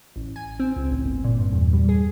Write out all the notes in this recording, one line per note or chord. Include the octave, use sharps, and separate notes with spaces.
A1
G#5
C4
C#2
A1
G1
A#2
G2
E2
G3
G#4